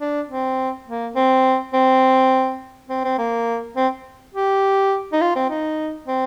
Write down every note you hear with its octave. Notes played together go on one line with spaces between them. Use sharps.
D4
C4
A#3
C4
C4
C4
C4
A#3
C4
G4
D#4
F4
C4
D#4
C4